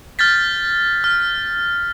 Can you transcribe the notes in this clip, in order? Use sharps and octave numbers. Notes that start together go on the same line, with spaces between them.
F6 G6 A6 B6
F6